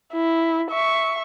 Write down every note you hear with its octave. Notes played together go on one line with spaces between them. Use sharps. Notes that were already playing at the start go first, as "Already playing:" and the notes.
E4
E5 C#6